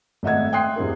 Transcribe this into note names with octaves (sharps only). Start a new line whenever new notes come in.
G#1 A3 D#5 E5 F#5 G#6
E5 G5 C6 D#6 F#6 C7
E2 G2 C4 A#4